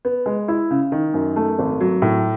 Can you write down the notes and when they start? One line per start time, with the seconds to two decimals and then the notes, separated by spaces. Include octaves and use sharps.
0.05 B3
0.26 G#3
0.48 E4
0.71 C#3
0.92 D#3
1.14 F#2
1.36 A3
1.59 G#1
1.80 F#3
2.02 A2